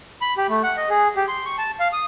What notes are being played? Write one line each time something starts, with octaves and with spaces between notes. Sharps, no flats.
B5
G4
A3
F#5
D#5
G#4
G4
C6
C#6
A5
F5
D#6